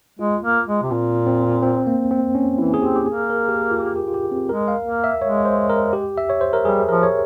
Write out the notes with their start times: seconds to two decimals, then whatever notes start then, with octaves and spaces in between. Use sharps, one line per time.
0.19 G#3 F4
0.44 A#3
0.68 G#3
0.82 C3
0.91 A#2 C4
1.27 C4
1.63 C4
1.87 A#3
2.11 C4
2.35 C#4
2.58 E3 E4
2.74 G#4
2.82 C4 G4
2.96 G4
3.06 A#3 G#4
3.30 A#4
3.49 G4
3.54 G#4
3.71 F4
3.78 G4
3.96 G4
4.08 F4
4.14 G4
4.32 C4
4.49 G#3 A#4
4.68 F5
4.85 A#3
5.04 E5
5.22 G#3 C#5
5.45 C5
5.69 A#4
5.93 G4
6.18 E5
6.30 C#5
6.41 C5
6.53 A#4
6.65 G3 G#4
6.89 F3 A#4
7.03 C#5